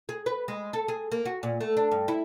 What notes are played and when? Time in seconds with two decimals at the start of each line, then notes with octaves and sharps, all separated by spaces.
0.09 G#4
0.26 B4
0.48 G#3
0.73 A4
0.88 G#4
1.12 A#3
1.25 F#4
1.43 A#2
1.61 A3
1.77 D4
1.91 G2
2.08 E4